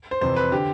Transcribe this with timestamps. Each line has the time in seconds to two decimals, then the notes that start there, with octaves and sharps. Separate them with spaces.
0.11 C5
0.21 F2 C3 E3 C5
0.36 B4
0.52 D3 G4